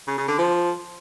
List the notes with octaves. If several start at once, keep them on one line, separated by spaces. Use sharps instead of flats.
C#3
C#3
D3
F3